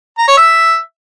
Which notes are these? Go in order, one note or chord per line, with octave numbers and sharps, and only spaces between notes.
A#5
C#5
E5